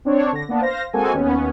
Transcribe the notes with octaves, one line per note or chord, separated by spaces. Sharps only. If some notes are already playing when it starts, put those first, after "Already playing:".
C4 D4 C#5
D3 A#6
A#3 B3 D4
C5 F5 A#6
G#3 A#3 C4 F#4 A4 G#5
D#2 B3 C#4